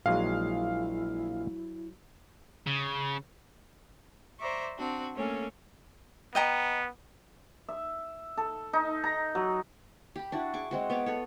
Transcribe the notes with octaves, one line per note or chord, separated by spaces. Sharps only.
A#1 F#3 G#3 E4 G#4 F5
C#3
C5 D5 E5 A#5 C#6 D6
C4 D4 F#4
A3 A#3 C#4 A4 C#5 G#5
B3 D#5 G5 A#5
E5
A4
D#4
A#5
F#3
G4 B5
D4 E4 F#4
G#4 C#6 D6
G#3 C4 F#4
B3 B4 C#5 D6
A4 B4 C#5